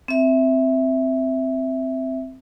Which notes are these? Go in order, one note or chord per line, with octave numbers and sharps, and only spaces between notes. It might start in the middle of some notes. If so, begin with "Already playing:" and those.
C4 E5